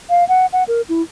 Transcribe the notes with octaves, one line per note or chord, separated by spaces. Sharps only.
F5
F#5
F#5
A#4
E4